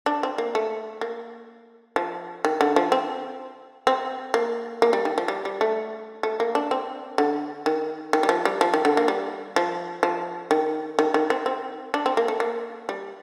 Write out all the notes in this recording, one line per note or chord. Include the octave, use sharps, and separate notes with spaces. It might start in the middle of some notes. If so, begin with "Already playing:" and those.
D4
C4
A#3
A3
A#3
F3
D#3
D3
F3
C4
C4
A#3
A#3
G3
D#3
F3
G3
G3
A3
A3
A#3
D4
C4
D3
D#3
D#3
G3
F3
G3
F3
D#3
D3
A#3
G3
F3
F3
D#3
D#3
D#3
C4
C4
D4
C4
A#3
A3
A#3
G3